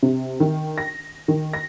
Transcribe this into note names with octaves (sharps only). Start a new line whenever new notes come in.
C3
D#3
A#6
D#3
A#6